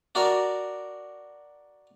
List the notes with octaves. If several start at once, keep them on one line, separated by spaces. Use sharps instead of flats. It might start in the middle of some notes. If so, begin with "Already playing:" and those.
D4 F#4 A#4 D5